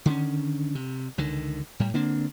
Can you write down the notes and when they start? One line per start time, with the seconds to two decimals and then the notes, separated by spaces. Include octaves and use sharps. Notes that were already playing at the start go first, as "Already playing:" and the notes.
0.05 D3 D#3 G#3 C#4
0.75 C3
1.18 C#2 D3 D#3
1.79 A2 G3
1.94 D3 A#3 C4 D4